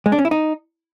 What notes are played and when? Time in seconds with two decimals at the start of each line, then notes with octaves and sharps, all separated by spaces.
0.06 G#3
0.12 D4
0.19 C#4
0.25 E4
0.31 D#4